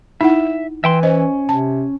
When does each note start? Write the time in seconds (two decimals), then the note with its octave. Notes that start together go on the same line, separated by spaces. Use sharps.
0.21 D#4 E4 E5 F#5
0.84 E3 E5 G5 C6
1.03 C#4 C5 D#5
1.49 C3 A5